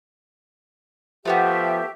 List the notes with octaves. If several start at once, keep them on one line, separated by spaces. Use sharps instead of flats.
F3 A3 B3 F#4 G4 E5